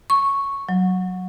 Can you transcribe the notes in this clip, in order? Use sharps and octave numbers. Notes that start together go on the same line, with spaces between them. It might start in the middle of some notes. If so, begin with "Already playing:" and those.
C#6
F#3